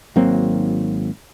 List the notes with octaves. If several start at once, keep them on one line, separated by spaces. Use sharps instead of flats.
G#1 F#3 A#3 C4